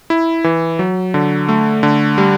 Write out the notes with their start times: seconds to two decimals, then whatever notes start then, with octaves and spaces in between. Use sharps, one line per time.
0.10 E4
0.44 E3
0.79 F#3
1.14 D3
1.49 A3
1.83 D3
2.18 G3